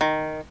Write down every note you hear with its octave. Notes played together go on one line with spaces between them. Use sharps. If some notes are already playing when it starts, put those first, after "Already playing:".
D#3